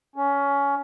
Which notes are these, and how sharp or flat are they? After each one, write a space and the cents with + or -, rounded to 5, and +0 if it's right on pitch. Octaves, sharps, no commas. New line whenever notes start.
C#4 +20